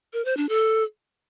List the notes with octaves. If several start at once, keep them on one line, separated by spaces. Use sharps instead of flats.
A#4
C5
D4
A4